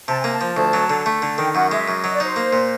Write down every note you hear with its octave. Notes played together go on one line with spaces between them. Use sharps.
C3 A5
A#3 G#5
A5
F3
D2
F#3
D3
A3
D3
D#3 G5
F#2 F#5
G#3 E5
F#2
F#3 D#5
D5
D#4 C5
A#3
A#2